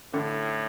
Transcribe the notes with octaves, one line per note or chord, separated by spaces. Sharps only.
A2 D3